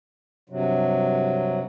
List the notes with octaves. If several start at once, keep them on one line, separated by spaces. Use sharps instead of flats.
G2 C3 F#3